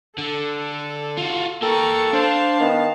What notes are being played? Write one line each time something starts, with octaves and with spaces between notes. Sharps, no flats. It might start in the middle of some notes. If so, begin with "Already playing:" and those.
D3 A4
F4 F#4
A#3 A4 A#4 G5 C#6
D4 C5 F5 A5
D#3 B3